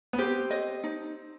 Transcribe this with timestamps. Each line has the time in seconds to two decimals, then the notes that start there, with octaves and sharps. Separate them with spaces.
0.13 B3
0.18 C4 G4
0.50 D#5
0.84 D#4